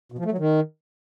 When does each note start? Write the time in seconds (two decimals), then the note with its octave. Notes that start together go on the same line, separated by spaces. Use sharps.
0.12 B2
0.18 F3
0.25 A3
0.31 F#3
0.38 D#3